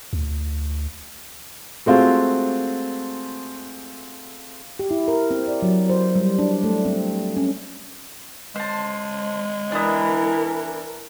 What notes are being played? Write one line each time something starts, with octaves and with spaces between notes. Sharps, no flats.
D2
G#3 A3 C4 F4 F#4
G4
E4
A#4
C4
D5
F#3
C5
G3
D4
A3
C4
C#4
G#3 C5 A5
E3 B3 D4 E4 A#4